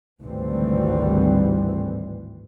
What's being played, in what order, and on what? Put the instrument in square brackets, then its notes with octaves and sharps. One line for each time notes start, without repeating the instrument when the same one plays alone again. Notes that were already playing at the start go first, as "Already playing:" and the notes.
[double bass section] G#1 D2 A2 E3 G3 C4